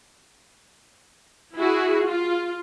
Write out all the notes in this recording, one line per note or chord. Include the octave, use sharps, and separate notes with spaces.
E4 F#4 G#4
F4